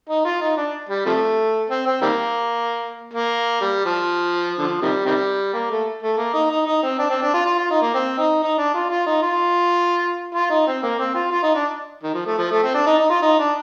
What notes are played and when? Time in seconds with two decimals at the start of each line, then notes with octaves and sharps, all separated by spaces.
0.09 D#4
0.25 F4
0.42 D#4
0.57 D4
0.89 G3
1.06 C3 F3 A3
1.69 C4
1.86 C4
2.02 D#3 G3 A#3
3.14 A#3
3.61 G3
3.85 F3
4.58 D3 F3
4.82 C3 D#3 G3
5.05 C3 D#3 G3
5.54 A#3
5.70 A3
6.03 A3
6.17 A#3
6.33 D#4
6.50 D#4
6.66 D#4
6.83 C4
6.99 D4
7.10 C4
7.22 D4
7.34 F4
7.46 F4
7.58 F4
7.71 D#4
7.82 A#3
7.94 C4
8.18 D#4
8.43 D#4
8.58 D4
8.74 F4
8.90 F4
9.06 D#4
9.22 F4
10.34 F4
10.50 D#4
10.67 C4
10.83 A#3
10.99 C4
11.15 F4
11.31 F4
11.43 D#4
11.55 D4
12.03 D#3
12.14 F3
12.26 A3
12.38 F3
12.51 A3
12.63 C4
12.74 D4
12.86 D#4
12.99 D#4
13.10 F4
13.22 D#4
13.39 D4